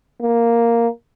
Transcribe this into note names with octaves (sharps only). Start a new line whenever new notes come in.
A#3